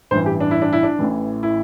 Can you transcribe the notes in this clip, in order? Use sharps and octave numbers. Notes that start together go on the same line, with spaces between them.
A1 G2 E3 C5
G4
D4
E4
D4
E4
D4
A1 A2 E3
E4